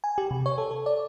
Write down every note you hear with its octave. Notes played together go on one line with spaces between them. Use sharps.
G#5
G4
C3
C#5
A4
A4
D5